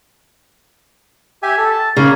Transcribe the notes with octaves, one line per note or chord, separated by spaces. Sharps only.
G4 E5 G#5
A4
A5
C#3 A#3 C#5